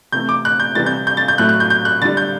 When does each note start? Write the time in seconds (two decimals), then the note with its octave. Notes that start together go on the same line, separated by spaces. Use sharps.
0.12 C3 E3 A3 G6
0.29 D6
0.45 F#6
0.60 G6
0.75 C3 E3 G3 A6
0.86 G6
1.07 G6
1.17 A6
1.28 G6
1.38 A2 F#3 A3 F#6
1.49 F#6
1.60 G6
1.70 G6
1.85 F#6
2.01 D3 A6
2.05 G3
2.17 G6